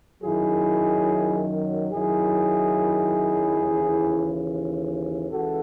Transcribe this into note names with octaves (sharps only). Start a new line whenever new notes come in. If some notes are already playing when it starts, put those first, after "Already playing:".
F#2 D#3 F#3 E4 G#4
F#2 D#3 F#3 E4 G#4
D#2 C#3 E3
C#2 C#3 E3 F#4 A4